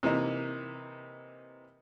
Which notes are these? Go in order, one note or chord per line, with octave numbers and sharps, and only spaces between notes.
C3 E3 A#3 D#4